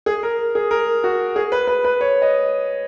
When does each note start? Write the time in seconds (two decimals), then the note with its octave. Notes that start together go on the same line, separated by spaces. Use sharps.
0.06 G#4
0.23 A#4
0.55 G#4
0.71 A#4
1.04 F#4
1.36 G#4
1.52 B4
1.67 B4
1.84 B4
2.01 C#5
2.22 D#5